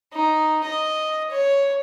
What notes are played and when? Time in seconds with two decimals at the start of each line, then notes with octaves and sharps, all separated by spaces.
0.13 D#4
0.64 D#5
1.31 C#5